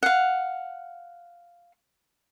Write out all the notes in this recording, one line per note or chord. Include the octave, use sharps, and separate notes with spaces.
F5 F#5